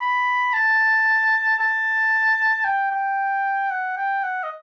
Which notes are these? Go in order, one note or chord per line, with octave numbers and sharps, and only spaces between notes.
B5
A5
A5
G5
G5
F#5
G5
F#5
D#5